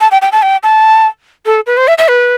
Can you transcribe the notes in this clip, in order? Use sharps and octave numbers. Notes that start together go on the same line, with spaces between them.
A5
G5
G5
A5
G5
A5
A4
B4
C5
E5
E5
B4